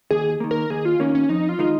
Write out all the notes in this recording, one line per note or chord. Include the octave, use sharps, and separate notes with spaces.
D#2 G#4
D#3 A#3
A#4
D#2 G#4
F4
D#3 A#3 C#4
C#4
F2 D#4
F4
D#3 G#3 D#4